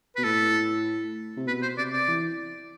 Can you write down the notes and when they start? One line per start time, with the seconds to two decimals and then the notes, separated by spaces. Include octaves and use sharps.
0.16 B2 B4
0.24 A2 A4
1.37 C3
1.47 B2 B4
1.62 C5
1.78 C3 D5
1.93 D5
2.08 E3